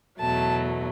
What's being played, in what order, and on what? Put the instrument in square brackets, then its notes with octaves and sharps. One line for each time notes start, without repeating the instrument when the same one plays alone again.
[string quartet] E2 B2 F#3 A3 A5